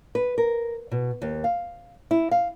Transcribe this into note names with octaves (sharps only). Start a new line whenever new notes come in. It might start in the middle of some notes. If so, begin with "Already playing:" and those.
B4
A#4
B2
D#2
F5
E4
F5